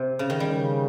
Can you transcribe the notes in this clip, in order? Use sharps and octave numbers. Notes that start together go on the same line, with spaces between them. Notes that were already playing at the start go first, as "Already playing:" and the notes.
Already playing: C3
C#3
D#3
G3
C#3